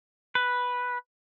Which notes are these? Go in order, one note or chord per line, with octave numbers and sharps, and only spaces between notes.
B4